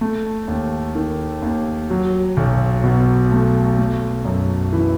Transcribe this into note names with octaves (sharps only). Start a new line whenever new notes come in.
A3
D#2
D#3
D#2
F#3
B1
B2
A3
A3
F#2
E3